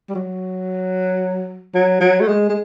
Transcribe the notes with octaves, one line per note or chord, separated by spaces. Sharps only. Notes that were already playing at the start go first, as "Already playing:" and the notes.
G3
F#3
F#3
F#3
A3
G#3
G#3